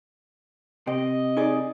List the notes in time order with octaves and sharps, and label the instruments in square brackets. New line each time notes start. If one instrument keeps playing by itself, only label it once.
[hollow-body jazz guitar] C3 G4 [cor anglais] D#5
[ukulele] D#4 G#4 D5